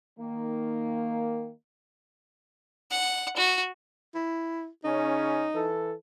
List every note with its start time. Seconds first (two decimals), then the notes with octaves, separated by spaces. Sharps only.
0.20 D#3 A#3
2.91 F#5
3.37 F#4
4.15 E4
4.84 C#3 C#4 D#4
5.54 E3 A4